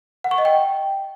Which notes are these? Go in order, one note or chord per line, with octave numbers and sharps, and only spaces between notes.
F#5
C#6
D#5
G5